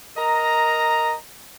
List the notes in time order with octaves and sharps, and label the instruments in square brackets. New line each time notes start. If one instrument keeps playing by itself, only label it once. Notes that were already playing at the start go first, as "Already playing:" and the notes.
[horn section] A#4 D#5 A#5